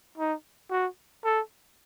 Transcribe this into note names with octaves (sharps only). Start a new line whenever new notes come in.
D#4
F#4
A4